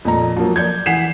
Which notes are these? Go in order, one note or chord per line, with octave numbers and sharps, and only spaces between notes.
F2 A#2 A#5
F3 F#3 A#3
D5 G6 G#6
E3 F#5 B6 C7 E7